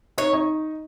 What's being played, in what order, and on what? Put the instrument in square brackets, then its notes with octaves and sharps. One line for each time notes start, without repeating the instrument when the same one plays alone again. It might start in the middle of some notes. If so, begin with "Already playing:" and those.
[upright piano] D#4 [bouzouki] C#5
[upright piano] D#4